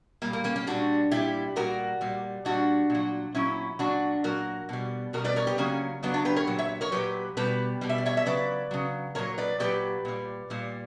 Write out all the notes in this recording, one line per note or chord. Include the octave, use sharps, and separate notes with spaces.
A#2 G3 A#3
A#3
A#3 C#4
A#3 C#4
A#2 G3 D4 F#4
A#2 G3 E4 G4
A#2 G3 F#4 A#4
A#2 G3
A#2 G3 D4 F#4
A#2 F#3
A#2 F#3 C#4 E4
A#2 F#3 D4 F#4
A#2 F#3 F#4 A#4
B2 G3
B2 G3 F#4 A#4
B4 D5
A#4 C#5
G4 B4
C#3 F#3 A#3 C#4
C#3 F#3 B3 D4
D4 F#4
G4 B4
A#4 C#5
A#2 F#3
C#5 E5
A#4 C#5
A#2 F#3 G4 B4
B2 G3 G4 B4
B2 G3
E5
D5
C#5 E5
E5
C#3 F#3 B4 D5
C#3 F#3
A#2 F#3 A#4 C#5
B4 D5
A#2 F#3 G4 B4
A#2 G3
A#2 G3